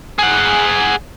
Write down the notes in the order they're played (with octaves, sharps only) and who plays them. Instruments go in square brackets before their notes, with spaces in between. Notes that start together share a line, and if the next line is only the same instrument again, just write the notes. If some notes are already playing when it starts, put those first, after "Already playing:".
[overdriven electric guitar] G#4 F#5